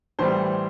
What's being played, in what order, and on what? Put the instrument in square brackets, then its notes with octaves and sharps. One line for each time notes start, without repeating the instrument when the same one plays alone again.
[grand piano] A2 E3 G3 C5